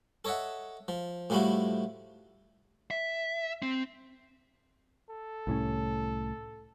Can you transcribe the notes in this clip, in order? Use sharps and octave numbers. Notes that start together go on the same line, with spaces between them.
A4 C#5 D#5 E5 F#5
F3
A2 F3 G3 A3 E4 F#4
E5
C4
A4
C2 A2 C#4